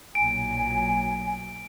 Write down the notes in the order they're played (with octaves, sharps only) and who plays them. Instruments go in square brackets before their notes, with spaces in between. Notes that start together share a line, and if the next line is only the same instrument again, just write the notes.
[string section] B1 A#2 F#3 [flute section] G#5 [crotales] D7